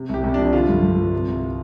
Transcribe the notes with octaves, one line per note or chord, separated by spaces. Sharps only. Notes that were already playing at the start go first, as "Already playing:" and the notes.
Already playing: C3
C2 G4
C2
F3 D4
D3 F4
G2
G2
F3
C3
C2